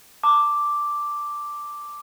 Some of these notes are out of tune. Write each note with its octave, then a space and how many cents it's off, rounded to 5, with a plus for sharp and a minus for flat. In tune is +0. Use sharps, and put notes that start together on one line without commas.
A5 +30 D6 +0